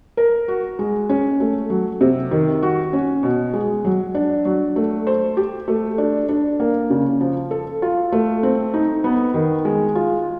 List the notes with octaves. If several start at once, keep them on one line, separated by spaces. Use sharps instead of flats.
A#4
F#4
G#3
C#4
A3
F#3
C3
D#3
F#4
C#4
B2
G#3
F#3
D4
F#3
A3
C5
G4
A3
D4
D4
A#3
C#3
F3
A4
F4
A3
C4
D#4
B3
D#3
G#3
F4